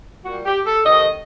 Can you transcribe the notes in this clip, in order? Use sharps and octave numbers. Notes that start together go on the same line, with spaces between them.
A#2 G3 F#4
G4
A4
C3 D#3 A3 D#5